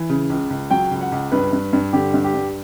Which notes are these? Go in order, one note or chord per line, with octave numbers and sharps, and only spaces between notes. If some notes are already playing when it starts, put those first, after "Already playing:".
Already playing: E3
C#3
C#2
C#2
F#3 G5
C#2
F#5
C#2
G2 B4
G2
G2
D3 G4
G2
G4
G2